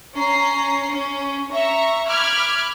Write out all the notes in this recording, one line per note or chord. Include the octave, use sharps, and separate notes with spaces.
C#4 A#5 C7
C#4
E5 A#5 C#6
B5 D6 F6 F#6 G#6